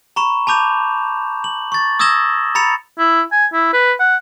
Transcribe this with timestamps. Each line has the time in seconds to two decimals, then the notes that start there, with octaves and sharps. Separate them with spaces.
0.16 A#5 B5 C#6 E7
0.47 A5 B5 D6 G6 F7
1.44 F#7
1.72 C#6 A6
1.99 D#6 E6 G#6 A#6 E7 G7
2.55 A#5 B5 A6 C#7 F7
2.99 E4
3.32 G#5
3.53 E4
3.73 B4
4.00 F#5